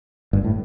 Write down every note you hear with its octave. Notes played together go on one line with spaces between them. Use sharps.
G1 G2
A2